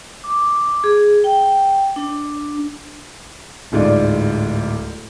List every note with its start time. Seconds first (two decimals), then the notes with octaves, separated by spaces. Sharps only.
0.24 D6
0.84 G#4
1.24 G5
1.96 D4
3.72 D1 G#2 F4 D5